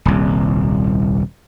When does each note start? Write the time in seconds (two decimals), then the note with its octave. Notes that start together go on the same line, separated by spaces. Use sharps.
0.05 D#1 C2